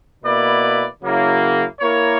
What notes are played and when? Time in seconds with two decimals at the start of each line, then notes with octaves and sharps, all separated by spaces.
0.23 B2 A#3 E4 B4 D5
1.02 C#3 F#3 A#3 E4
1.81 A#3 E4 A#4 C#5